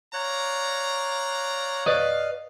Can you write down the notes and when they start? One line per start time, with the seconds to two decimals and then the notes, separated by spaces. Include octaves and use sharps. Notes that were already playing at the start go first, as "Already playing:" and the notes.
0.14 C#5 D5 F5 A#5 F#6
1.86 B4 D5 D#5 F5